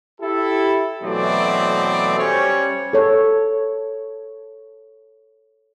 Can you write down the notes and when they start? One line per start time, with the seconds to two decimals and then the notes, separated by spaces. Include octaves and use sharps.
0.21 E4 G4 A4
1.03 B2 E3 F#3 A3 C4 D5
2.18 G3 C#4 C5 C#5
2.93 A4 C#5